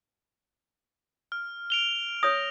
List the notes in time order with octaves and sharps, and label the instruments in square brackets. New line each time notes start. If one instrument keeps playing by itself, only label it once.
[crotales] F6
D7 F7 G7
[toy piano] C#5 D#6 [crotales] A#6